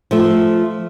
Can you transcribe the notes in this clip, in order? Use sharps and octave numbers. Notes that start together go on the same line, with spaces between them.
F3 A3 E5